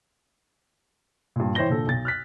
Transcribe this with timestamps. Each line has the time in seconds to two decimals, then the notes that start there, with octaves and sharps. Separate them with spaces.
1.36 G2 A#2
1.55 E3 C5 C#5 G5 A#6 G7
1.69 A#2 D3 A4
1.87 B1 A6
2.05 F6 F#6 B6